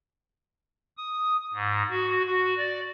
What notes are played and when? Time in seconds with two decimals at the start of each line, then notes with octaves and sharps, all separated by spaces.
0.97 D#6
1.54 G#2
1.90 F#4
2.25 F#4
2.57 D5